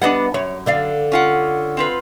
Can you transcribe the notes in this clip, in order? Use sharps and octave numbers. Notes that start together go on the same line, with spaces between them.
G3 B3 D4 D#5 F#5
F#2 C#5
D3 D5 F5
C#4 F4 F#5
C4 F4 B4